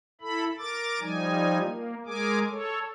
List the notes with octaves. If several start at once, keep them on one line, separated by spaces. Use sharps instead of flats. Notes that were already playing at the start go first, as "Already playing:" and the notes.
E4 A4 B5
A#4 D6 A6
F3 G3 D#4 G#5
A#3
G#3 G#4 A#4 G#5 D6
A4 C#5